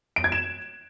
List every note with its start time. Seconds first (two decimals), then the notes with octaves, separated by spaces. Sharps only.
0.16 D7
0.24 G#6
0.32 E7